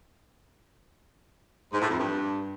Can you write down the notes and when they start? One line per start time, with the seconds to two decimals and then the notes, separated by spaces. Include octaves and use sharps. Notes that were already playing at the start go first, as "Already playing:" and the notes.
1.72 G#2
1.81 A2
1.90 F2
1.99 G2